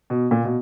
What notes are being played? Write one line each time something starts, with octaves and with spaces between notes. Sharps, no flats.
B2
A#2
B2